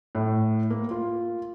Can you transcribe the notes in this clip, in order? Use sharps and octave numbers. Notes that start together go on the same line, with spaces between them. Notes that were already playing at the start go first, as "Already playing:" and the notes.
A2
A#3
F4